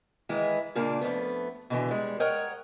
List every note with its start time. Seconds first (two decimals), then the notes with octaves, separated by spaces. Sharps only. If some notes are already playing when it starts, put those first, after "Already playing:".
0.29 D#3 E3 G#3 E4
0.75 A#2 C#3 A#3 D4
1.01 F2 A3 B3
1.70 B2 D3 E3
1.88 G3 G#3
2.20 A#4 C#5 D#5 F#5 G5